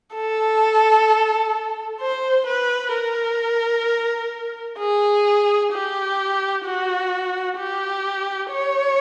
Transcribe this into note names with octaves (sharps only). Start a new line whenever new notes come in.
A4
C5
B4
A#4
G#4
G4
F#4
G4
C#5